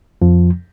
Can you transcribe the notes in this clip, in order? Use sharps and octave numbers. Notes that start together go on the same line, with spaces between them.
F2 F3